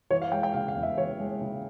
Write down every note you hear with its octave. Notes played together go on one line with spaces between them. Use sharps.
E3 C#5
F5
G#3 G5
G5
C#3 F5
F5
E2
E5
E3 C#5
G#3
C#3